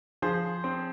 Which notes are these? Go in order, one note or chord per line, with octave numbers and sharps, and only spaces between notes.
F3 G#4 C5
C4